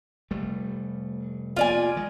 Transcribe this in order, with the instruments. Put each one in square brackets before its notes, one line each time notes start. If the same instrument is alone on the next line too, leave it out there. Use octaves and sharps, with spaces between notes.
[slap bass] F1 G3 A3
[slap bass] F1 A#3 B3 [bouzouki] F4 D5 G#5
[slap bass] D#3 G#3